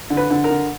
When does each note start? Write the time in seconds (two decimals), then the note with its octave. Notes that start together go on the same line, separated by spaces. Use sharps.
0.10 D3
0.17 B4
0.30 D3
0.44 A#4
0.50 D3